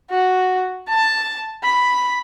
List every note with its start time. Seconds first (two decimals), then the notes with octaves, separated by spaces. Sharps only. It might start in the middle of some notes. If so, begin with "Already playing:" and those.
0.10 F#4
0.89 A5
1.64 B5